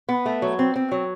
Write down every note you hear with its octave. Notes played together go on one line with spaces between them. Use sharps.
B3
A3
F#3
C4
C4
F#3